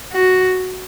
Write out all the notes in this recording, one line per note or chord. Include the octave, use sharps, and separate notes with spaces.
F#4